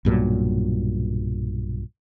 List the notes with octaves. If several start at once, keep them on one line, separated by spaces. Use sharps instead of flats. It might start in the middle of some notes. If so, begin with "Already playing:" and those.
B1 G2 A#2 F#3